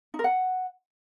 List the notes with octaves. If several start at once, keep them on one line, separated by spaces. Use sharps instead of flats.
D#4
A#4
F#5